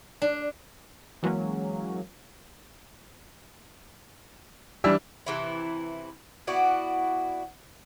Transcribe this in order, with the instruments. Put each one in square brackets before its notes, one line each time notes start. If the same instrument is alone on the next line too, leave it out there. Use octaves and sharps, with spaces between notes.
[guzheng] D4
[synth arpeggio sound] E3 F#3 G#3 A#3 C#4
[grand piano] E3 D4 E6 [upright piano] G3
[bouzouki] C3 E3 E4
B3 E4 F#4 D5